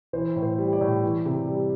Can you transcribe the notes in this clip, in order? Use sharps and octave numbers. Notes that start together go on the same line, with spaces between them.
E3 C5
A2
C5
G3
D5
A2
E3
C3
G3